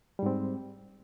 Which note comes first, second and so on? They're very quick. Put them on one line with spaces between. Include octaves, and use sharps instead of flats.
G3 G#2 C4